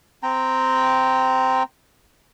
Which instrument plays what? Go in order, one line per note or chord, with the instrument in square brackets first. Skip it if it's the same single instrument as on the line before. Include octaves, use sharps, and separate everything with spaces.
[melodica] C4 G5 A#5